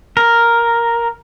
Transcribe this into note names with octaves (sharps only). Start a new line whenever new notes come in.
A#4